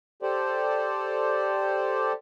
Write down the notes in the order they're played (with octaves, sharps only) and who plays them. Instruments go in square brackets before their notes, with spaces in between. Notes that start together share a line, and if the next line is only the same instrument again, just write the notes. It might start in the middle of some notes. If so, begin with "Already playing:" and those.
[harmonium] G4 A4 C5 D5